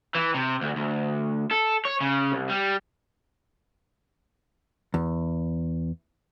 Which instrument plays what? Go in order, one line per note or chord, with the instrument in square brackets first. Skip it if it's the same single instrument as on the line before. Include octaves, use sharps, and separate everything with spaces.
[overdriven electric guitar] E3
C3
D2
D2
A4
C#5
C#3
C2
G3
[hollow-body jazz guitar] E2